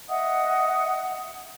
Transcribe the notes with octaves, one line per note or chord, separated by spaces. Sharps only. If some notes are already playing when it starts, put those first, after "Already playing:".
D#5 E5 F#5 D#6